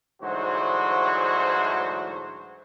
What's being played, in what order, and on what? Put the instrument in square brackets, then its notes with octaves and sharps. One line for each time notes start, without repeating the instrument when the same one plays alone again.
[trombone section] D2 G#2 E3 F#3 F#4 C5